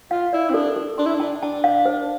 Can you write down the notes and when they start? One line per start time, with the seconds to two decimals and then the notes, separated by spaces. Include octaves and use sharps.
0.11 F4 F5
0.33 E4 D5
0.50 C4
0.54 D4 A4
0.76 A4
0.98 D4 C6
1.06 E4
1.15 D4
1.20 A5
1.42 D4 A5
1.64 F5
1.86 C5